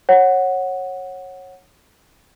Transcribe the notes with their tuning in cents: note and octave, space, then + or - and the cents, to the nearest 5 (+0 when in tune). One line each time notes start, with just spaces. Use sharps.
C#5 -20 F#5 -5